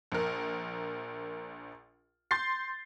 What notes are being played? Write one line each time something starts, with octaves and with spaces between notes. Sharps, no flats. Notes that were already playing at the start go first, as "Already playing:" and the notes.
A#1 A#4
C6 G6 A6 C7